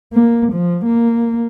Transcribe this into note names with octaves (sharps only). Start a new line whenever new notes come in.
A#3
F3
A#3